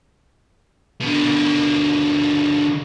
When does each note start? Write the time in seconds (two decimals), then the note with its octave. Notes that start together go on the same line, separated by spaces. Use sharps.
1.01 B2 D3